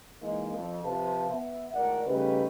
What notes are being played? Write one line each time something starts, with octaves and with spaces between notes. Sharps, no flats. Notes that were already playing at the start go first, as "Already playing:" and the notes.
E3 G#3 A#3 D#4
F2
C3 F3 B4 F5 A5
B3 E5
G#1 A2 A#4 D5 F#5
C#3 G3 A3 D#4 G4 B4